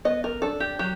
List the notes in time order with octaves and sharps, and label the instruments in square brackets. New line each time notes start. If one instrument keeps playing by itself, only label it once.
[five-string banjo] B3 D#5
A#4
D4 A4
G4
F#3 G4